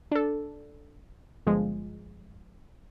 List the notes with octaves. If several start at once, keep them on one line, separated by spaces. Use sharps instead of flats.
D4 A4
G1 F3 G#3